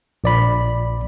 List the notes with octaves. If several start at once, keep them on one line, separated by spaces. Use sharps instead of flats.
A#1 D5 B5